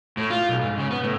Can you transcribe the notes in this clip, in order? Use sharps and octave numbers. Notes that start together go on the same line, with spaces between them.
A2
F4
B1
G#2
C#3
B3
A2